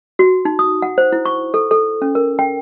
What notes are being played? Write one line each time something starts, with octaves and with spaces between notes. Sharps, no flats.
F#4
D#4
D#6
F#5
C5
E4
C#6
A4
A4
C#4
A#4
G5